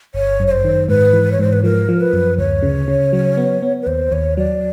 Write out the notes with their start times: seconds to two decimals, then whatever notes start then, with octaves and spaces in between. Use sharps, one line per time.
0.14 G1 C#5
0.40 F#2
0.47 C#5
0.51 C5
0.65 D#3
0.88 G#2 B4
1.13 E3
1.32 C#5
1.39 G#2 C5
1.53 B4
1.64 F3 A#4
1.89 F3
2.01 B4
2.13 F#2
2.38 D2 C#5
2.63 C#3
2.88 C#3
3.13 F#3
3.37 B3
3.63 B3
3.82 B4
3.87 D#2 C5
4.12 D#2 C#5
4.37 F#3 D5